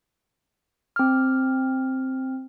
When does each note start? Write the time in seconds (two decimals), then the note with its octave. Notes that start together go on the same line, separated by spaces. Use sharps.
0.96 C4 F6